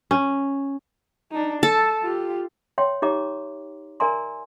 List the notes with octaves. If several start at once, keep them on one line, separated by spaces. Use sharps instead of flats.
C#4
D4 D#4
A4 A5
F4 G4
C#5 E5 G5 C6
D#4 G4 C#5 E5 A#5 D6
A#4 D5 E5 G#5 A#5 C6